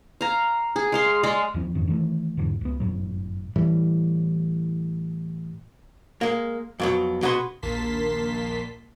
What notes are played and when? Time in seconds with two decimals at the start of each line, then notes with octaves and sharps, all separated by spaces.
0.21 F5 A#5
0.76 G#4
0.92 G#3 F5 C6
1.23 G#3 D5 D#5 F5
1.54 D#2 F3 C4
1.75 F2 G#2 D#3 C#4
1.87 D#3 E3 G3 A3
2.37 E2 G#2 D3
2.61 C#2 B3
2.80 G1 F#2 A2 F#3
3.56 A2 E3 G3
6.21 G#3 A#3
6.80 F2 B2 F#3
7.23 B2 F#4 G#4 B4 A#5 C6
7.62 A#1 D#2 A#3 A5 C6 B6